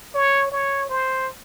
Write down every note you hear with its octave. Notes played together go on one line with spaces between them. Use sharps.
C#5
C#5
C5